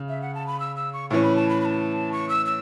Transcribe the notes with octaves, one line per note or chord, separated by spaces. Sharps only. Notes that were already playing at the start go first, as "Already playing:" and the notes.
Already playing: C#3
E5
F#5
A5
B5
E6
E6
C#6
A2 E3 C#4 C#6
B5
A5
B5
B5
A5
C#6
E6
E6